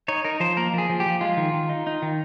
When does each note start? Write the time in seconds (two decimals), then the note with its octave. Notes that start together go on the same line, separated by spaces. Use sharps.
0.08 D#4 C#5
0.24 D#4 A#4
0.40 F3 C5
0.57 A#3 A#4
0.73 F3 G#4
0.89 F3
1.00 G4
1.06 F3
1.21 G#3 F4
1.37 D#3
1.54 D#3
1.69 D#4
1.87 D#4
2.02 D#3